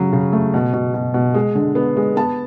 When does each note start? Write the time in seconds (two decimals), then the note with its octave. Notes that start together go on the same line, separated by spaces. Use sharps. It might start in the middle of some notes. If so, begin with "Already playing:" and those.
Already playing: C#3 F#3
0.13 C#3
0.33 A3
0.54 B2
0.74 B2
0.94 B2
1.14 B2
1.34 G#3
1.55 D3
1.75 B3
1.96 G#3
2.16 B3 A5